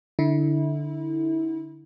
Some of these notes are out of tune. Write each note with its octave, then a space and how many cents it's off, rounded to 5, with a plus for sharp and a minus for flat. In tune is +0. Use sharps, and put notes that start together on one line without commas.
D3 +0 E4 -30